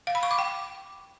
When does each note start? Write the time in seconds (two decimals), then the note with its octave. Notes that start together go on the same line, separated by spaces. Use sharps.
0.07 F5
0.15 B5
0.23 C#6
0.31 D6
0.39 G5